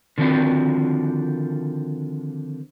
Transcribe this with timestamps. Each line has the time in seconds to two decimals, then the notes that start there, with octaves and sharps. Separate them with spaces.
0.18 D3 D#3 F3 C4 F#4 D5